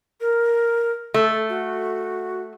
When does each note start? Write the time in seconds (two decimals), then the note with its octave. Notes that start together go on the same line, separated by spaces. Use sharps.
0.21 A#4
1.14 A3 A4
1.49 F#4